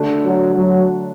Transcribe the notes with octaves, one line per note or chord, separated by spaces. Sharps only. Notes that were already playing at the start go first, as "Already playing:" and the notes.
Already playing: D3 A3 D4 F#4 A4
F#3
F#3